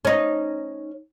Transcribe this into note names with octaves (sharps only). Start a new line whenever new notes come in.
C#4 D#4